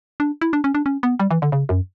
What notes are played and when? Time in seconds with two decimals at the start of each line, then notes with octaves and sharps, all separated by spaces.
0.20 D4
0.41 E4
0.53 D4
0.64 C#4
0.75 D4
0.86 C#4
1.03 B3
1.20 G3
1.31 E3
1.42 D3
1.52 C#3
1.69 F#2